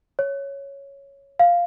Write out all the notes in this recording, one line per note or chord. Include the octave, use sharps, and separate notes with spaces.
C#5
F5